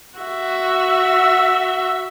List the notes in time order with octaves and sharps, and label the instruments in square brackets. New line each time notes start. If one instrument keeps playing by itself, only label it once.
[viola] F#4 E5